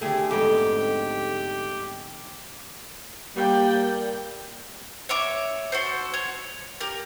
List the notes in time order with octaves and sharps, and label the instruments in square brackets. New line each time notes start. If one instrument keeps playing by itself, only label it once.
[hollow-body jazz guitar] D3 A3 [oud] G4 [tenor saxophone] G#4
[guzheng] F2 B3 [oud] G#2 D#4 [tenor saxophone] G4
[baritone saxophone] G3 [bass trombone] A#3 [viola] D5 G5
[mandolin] C#5 E5 D6
F#4 A4 C5
C#5
G4 A#4